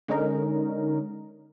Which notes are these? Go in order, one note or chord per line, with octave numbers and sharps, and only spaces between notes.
D3 G#3 C#4 D#4 A#4